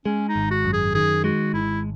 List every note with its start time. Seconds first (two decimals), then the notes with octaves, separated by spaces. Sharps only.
0.06 G#3 C#4
0.29 D#4
0.36 G#1
0.51 F#4
0.65 F#2
0.73 G#4
0.95 D#3 G#4
1.24 G#3 F#4
1.54 G#1 E4